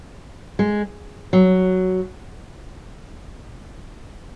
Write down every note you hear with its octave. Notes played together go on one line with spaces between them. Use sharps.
G#3
F#3